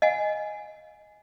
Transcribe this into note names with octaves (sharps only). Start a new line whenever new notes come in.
D#5 F5 G#5